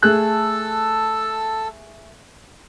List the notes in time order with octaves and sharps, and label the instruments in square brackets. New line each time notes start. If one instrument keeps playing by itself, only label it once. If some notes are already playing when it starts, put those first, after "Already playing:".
[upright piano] A3 G#4 F#6 [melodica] A4 A5 E6